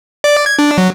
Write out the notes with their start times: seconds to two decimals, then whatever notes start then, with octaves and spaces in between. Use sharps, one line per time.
0.24 D5
0.46 G#6
0.59 D4
0.78 F#3